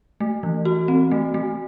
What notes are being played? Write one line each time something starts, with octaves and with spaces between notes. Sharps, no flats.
A3
E3
F#4
C4
A3
A3